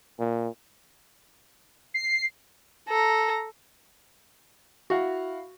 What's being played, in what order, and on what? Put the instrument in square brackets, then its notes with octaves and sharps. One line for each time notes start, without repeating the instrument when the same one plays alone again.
[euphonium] A#2
[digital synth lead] C7
[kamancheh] A4 A#5
[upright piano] E4 F5 F#5 [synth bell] F#4